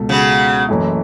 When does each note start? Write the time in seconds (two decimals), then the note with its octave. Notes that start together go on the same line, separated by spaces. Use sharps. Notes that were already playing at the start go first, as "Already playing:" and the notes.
Already playing: C#2 B2 A4
0.09 C#3 F#3
0.69 F#1 F#2 E3 A3 E4